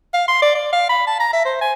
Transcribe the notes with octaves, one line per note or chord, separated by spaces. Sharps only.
F5
C6
D5
D5
F5
B5
A5
A#5
E5
C5
G#5